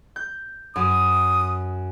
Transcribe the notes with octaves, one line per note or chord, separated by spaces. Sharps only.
G6
F#2 D#6